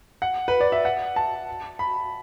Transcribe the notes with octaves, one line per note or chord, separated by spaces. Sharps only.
F#5
B4
D5
E5
F#5
A5
B5